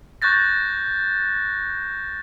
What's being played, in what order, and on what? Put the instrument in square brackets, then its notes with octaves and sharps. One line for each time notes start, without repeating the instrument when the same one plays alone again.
[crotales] C#6 F#6 G6 A6 A#6